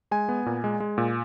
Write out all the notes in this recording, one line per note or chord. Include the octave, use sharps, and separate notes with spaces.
G#3 G#5
B3
A#2
G#3
G#3
A#2